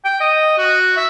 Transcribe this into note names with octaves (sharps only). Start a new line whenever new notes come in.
G5
D#5
F#4
E5